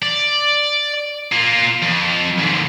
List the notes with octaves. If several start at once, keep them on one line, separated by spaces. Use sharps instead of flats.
D5
A#3 F4
F2
D#2 G#2